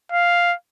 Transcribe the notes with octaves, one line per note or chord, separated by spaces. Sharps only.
F5